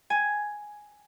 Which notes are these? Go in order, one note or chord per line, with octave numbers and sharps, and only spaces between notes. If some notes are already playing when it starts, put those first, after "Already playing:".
G#5